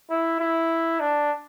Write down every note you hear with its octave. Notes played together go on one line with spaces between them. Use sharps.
E4
E4
D4